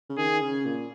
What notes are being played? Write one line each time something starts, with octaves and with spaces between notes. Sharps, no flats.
C#3
D#3 G#4
C#3
A#2